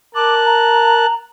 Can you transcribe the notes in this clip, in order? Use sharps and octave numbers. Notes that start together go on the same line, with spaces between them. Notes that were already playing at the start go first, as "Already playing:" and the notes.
A#4 A5 D6 F#6
A#5